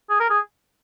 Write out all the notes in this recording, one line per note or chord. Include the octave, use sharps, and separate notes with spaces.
G#4
A#4
G#4